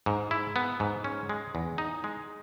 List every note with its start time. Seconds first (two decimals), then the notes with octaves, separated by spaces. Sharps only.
0.06 G#2
0.31 E4
0.56 B3
0.80 G#2
1.04 C#4
1.29 G#3
1.55 E2
1.78 D#4
2.04 G#3